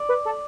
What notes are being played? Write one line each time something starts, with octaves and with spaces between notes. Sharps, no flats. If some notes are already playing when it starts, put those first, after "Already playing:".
Already playing: D5
B4
A4